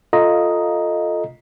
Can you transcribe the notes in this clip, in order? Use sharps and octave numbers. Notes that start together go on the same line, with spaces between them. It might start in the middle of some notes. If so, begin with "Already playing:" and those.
F4 A4 D#5 F5 A#5